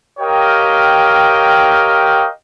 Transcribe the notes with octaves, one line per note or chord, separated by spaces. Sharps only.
G4 A#4 C#5 D#5 F5 G5